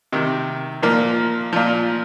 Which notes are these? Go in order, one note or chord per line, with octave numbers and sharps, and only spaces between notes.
C3 D#3
A#2 F3 A#3
A#2 F3